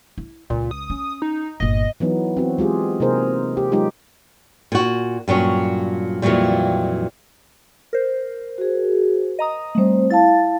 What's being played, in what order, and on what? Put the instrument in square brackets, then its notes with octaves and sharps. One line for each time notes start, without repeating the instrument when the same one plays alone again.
[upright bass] E4
[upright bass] C#2 [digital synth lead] A#2
[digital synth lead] D#6
[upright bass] C#4
[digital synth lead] D#4
[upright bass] G1 A#2 [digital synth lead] D#5
[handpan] E3 F#3 B3 D#4
C4 F#4
G#3 F4 G4 G#4
C3 A#3 D#4 G#4 A#4 C5
G4
F#3 G#3 D#4 F4 G4
[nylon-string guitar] A#2 F#4
G2 A#2 F#3 C#4
F2 A#2 C#3 E3 F#3 G3
[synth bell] A#4 C5
[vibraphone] F#4 G#4
[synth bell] D#5 A#5 D#6
[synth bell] G3 A3 [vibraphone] C4 C5
[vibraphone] E4 F5 A5 [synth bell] A6